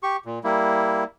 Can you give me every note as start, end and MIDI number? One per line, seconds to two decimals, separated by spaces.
0.03 0.17 67
0.03 0.17 85
0.26 0.39 46
0.44 1.04 55
0.44 1.04 58
0.44 1.04 64